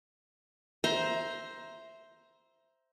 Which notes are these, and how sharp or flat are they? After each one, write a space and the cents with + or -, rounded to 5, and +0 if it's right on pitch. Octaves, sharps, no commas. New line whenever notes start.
C5 +0 E5 +0 A#5 +20